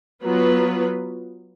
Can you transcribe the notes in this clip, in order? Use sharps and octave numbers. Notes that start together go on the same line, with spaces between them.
F#3 B3 F4 B4